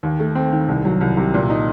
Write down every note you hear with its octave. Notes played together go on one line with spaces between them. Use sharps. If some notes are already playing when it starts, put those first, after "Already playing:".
D#2
A3
C4
D#3
C2
F#3
C2
C3
A#2
D#4